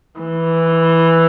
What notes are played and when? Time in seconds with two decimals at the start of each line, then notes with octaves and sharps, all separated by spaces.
0.20 E3